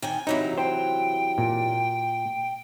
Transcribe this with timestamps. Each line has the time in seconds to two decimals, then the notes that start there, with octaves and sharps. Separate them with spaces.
0.02 D#3 G5 G#5
0.27 C3 E3 F#3 D#4 E4
0.58 C5 G5
1.38 A#2